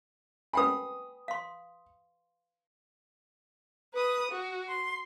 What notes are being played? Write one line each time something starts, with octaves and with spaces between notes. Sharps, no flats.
B4 G5 G#5 B5 D#6
F5 C6
B4 D#6
F#4
C6